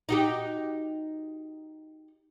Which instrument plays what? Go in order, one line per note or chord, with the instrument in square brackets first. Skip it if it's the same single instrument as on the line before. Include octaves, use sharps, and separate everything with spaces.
[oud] D#4 F#4 G4